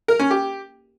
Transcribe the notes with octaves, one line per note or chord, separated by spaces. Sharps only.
A#4
C#4
G4